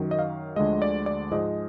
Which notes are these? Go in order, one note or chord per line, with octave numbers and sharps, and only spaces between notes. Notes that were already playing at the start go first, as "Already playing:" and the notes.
Already playing: F#2 D#3 F#3
D#5
F5
D2 D3 F3 G#3 D#5
D5
D5
G#2 F3 G#3 D#5